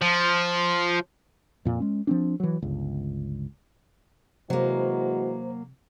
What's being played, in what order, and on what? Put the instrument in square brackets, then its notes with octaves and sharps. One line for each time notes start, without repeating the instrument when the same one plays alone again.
[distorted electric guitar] F3
[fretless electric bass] F2 A#2
G#3 C#4
F3 C4 D4
E3 F#3
G1 C#2
[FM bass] C3 [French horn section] E3 G#3 F#4 [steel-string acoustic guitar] F#3 A#3 [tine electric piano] C5